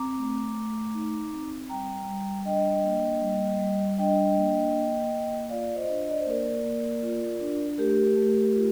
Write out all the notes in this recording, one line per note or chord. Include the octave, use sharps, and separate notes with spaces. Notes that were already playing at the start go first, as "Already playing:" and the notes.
Already playing: C4 A#5 D6
A3
A3
D#4
C4
G3 G5 A#5
G3
D4 D#5 G5
A#3
G3
G3
D4 D#5 G5
A#3
A#3
A#3
F4 D5 F5
C5 D#5
D4
D#5
D5
C5
A#3 A#4 D5
A#3
F4
D4
A3 G4 A#4
A3
F4